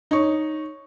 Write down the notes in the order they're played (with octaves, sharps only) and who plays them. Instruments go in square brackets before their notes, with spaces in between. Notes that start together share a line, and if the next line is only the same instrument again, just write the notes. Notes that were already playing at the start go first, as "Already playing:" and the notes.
[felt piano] D#4 C#5 C#6